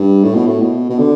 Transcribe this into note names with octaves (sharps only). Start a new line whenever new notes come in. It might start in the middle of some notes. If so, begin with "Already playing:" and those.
Already playing: G2
A2
B2
A2
B2
B2
D3